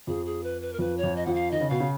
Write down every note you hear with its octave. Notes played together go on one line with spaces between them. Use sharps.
F2 F3 G#4
G#4
B4
B4
A#4
F2 F3 B4
C#5
F2 F3
D#5
F2 F3 F#5
F5
D#3 D#5
C#3
B2 F5
C#3